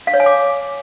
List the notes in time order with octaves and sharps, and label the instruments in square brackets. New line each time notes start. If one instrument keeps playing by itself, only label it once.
[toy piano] F5
C#5
G#5
D6